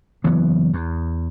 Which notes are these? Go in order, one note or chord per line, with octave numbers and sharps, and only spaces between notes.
F#1 E3 F#3 B3
E2